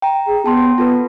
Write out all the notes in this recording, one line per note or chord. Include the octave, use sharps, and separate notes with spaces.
G5 A#5
G#4
B3 A5 C6
B3 F4 A4 B4